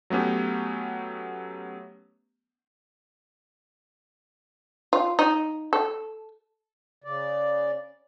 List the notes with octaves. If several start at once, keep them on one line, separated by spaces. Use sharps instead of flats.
F#3 A3 B3 C#4 G4
F4
D#4
A4
C#3 D5